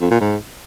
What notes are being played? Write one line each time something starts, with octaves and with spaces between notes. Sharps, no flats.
F2
A#2
G#2